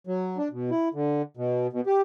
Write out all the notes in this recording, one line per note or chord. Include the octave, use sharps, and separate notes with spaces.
F#3
D4
B2
E4
D3
B2
B2
G4